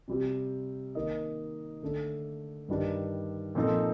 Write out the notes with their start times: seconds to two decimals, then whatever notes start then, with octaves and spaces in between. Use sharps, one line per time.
0.08 C3 G3 C4 G4
0.95 D#3 A#3 D#4 A#4 D#5
1.82 D3 A3 D4 A4
2.68 G2 D#3 G3 D4
3.55 A#2 F3 C4 D#4 A4